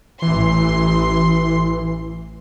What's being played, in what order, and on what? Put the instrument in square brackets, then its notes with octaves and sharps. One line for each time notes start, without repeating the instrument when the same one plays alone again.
[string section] A1 C6 [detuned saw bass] E3